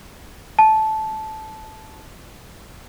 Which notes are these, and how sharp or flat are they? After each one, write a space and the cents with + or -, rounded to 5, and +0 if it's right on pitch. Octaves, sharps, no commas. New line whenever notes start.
A5 -15